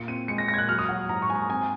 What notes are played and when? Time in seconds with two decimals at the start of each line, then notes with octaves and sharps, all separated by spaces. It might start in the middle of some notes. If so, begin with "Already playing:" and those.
Already playing: A#2 C#7
0.08 C4 D#7
0.28 G#3 C#7
0.38 A#6
0.48 A#2 A#6
0.54 G#6
0.58 F#6
0.69 F#3 F6
0.79 D#6
0.89 F#3 F#5
1.09 G#2 A#5
1.22 C#6
1.29 G#2 G#5
1.36 A#5
1.50 C4 G#5